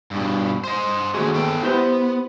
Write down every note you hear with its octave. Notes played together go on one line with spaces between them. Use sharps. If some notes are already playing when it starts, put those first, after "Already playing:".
G2 B2
C5 D#5
D#2 D3 A3 F#4 G#4
B3 A4 G5
B3 E4 G4 C5